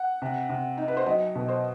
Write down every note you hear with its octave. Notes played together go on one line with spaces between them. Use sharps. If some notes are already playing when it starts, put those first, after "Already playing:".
Already playing: F#5
C3
C3
D#4
B4
C5
F#3 D#5
B2
C5